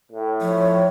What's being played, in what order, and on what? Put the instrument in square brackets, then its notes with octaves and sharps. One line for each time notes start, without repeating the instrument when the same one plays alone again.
[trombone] A2
[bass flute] F3 [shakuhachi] C#5